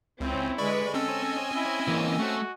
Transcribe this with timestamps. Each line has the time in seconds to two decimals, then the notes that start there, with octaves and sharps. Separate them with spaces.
0.20 C#2 C4 C#4 E4
0.58 D3 G#3 B4 D5 B5 C#6
0.94 C4 C#4 A4 D#5 G#5 E6
1.56 E4
1.88 E3 A#3
2.19 A3 F#4